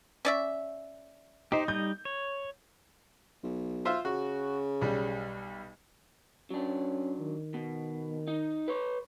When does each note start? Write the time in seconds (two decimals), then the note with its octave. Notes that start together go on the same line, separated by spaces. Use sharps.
0.25 C#4 D5 E5
1.52 D#4 G4 C5
1.68 G3 D#4 D#5 G6
2.05 C#5
3.43 B1
3.85 F4 C5 E5
4.05 C#3 F#4
4.81 B1 G3
6.51 F#3 C#4 D4
7.20 D#3
7.54 B2
8.28 D#4
8.68 B4 C#5